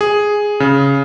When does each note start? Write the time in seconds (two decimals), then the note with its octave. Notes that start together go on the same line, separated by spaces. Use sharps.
0.01 G#4
0.60 C#3